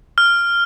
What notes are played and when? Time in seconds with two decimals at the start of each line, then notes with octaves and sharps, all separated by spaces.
0.18 F6